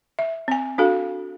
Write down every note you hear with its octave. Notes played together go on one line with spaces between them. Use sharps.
E5
C4 G#5
D4 F#4 A4 F5